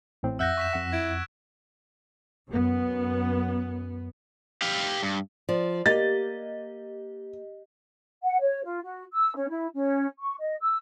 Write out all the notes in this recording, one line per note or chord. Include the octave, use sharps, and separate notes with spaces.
A1 A2 C4
F2 E5 F#5 E6 F#6 G6 A#6
C#6 B6 E7
F2 F#5
E4 G#6 D7
F#2 B3
G4 F5
G2
F3 D5
A#3 G4 D#5 A6
F#5
C#5
F4
F#4
E6
C#4
E4
C#4
C#6
D#5
E6